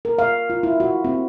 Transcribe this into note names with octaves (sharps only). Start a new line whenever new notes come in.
A#4
F5
F4
E4
F#4
C4